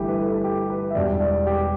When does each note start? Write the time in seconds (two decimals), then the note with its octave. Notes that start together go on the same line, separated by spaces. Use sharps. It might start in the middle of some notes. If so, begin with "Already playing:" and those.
Already playing: G1 G2 E3 A3 E4 G4
0.08 B4
0.19 A4
0.35 A4
0.44 G4
0.70 B4
0.91 E5
0.95 E1 E2 B2 G3 D4 D5
1.21 D5
1.47 G4